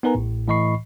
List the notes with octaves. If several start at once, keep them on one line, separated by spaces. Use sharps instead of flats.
B3 D#4 A#4 B4 G#5 A#5
A1 A2
A2 E3 D#5 B5 C#6 C7